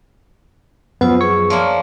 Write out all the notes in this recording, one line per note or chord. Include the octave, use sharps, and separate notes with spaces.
F#2 F3 B3 F4 C5 E6
G#4 C#6
F3 A#3 C#5 D5 E5